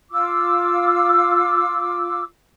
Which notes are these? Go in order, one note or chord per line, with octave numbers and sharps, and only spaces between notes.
F4 D6 E6